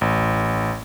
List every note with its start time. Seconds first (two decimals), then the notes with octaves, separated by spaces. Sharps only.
0.01 A1